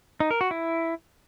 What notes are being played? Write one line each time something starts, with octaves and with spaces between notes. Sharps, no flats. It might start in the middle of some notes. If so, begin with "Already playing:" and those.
D#4
A#4
F#4
E4